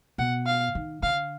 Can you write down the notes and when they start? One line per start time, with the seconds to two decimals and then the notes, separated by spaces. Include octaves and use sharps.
0.18 B2 F#5
0.46 F5
0.75 D#3
1.03 D3 F5